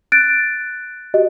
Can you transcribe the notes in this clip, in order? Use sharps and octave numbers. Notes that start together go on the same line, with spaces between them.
F#6 A6 D7
F#4 G4 D#5